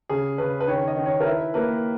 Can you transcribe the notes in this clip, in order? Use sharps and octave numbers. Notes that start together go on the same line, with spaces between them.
C#3 G#4
C#3 B4
B4
D#3 C#5
D#5
D#3
C#5
A#4
E4 B4
A#3 B4